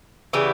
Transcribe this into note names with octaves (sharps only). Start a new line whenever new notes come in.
C#3 E3 G3 B3 G4